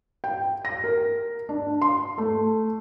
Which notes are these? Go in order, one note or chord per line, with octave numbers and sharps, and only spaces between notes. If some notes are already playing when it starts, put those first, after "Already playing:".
G5
A#6
A#4
D4
C6
A3